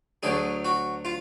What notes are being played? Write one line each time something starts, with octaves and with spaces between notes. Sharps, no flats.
D2 D3 F#3 G#4
F#4
F4